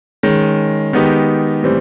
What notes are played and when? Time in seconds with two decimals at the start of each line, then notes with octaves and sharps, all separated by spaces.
0.23 D#3 G#3 C#4
0.93 D#3 G#3 B3 D#4 G4
1.63 A2 E3 G3 C4